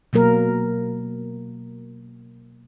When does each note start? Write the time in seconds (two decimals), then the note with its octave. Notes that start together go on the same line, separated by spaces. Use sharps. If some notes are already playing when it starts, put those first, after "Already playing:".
0.13 B2 F#3 A#3 A#4